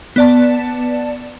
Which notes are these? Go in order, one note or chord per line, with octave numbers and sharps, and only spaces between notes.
B3 D5 A5